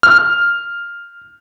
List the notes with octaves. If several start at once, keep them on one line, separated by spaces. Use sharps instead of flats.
F6